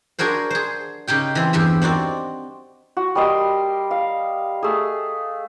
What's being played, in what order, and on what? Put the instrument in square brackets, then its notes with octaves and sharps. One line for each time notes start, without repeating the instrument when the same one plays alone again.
[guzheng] D4 F#4 G#4 A#4 C5
G#4 C5
C#3 D#4 G4 G5
E3 C4
E2 G2 G4 E5
C4 D#4 F#4 D5
[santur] F#4
G3 A#4 D#5 C6
F5
A3 G#4